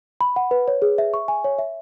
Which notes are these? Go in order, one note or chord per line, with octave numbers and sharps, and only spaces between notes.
B5
F#5
B4
C#5
G#4
E5
C#6
G#5
C#5
E5